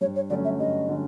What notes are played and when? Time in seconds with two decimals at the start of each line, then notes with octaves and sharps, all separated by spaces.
0.01 G2 C#5
0.16 C#5
0.30 D3 F#3 A3 C#4 D5
0.44 E5
0.59 G2 D#5
0.89 D3 F#3 A3 C#4